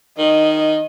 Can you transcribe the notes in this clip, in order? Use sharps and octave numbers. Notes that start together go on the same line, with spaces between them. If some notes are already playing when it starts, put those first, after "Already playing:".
D#3 D#5